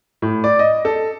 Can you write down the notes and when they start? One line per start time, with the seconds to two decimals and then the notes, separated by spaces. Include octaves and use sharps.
0.22 A2
0.44 D5
0.59 D#5
0.85 A4